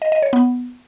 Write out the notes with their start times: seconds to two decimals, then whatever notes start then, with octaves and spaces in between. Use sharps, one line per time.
0.02 D#5
0.12 D#5
0.22 C#5
0.33 B3